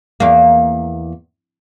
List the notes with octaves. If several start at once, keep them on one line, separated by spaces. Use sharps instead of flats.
E2 A#3